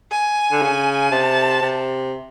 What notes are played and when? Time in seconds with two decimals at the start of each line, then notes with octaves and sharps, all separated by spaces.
0.12 G#5
0.52 D3
0.62 C#3
1.12 C3 A5
1.62 C3